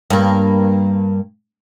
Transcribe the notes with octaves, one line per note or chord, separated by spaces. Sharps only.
G2 A#3